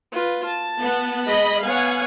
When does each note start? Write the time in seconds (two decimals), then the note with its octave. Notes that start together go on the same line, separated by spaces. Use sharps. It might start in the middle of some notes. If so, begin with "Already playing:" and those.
0.12 F4 B4
0.45 A5
0.81 B3 F#5
1.26 G#3 D#5 B5
1.63 B3 C#5 F5 F#5 G#5